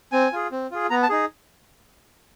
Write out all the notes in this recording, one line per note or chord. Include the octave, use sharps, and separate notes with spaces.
C4 G#5
F4 G#4
C4
F4 G#4
B3 A#5
A5
D#4 G#4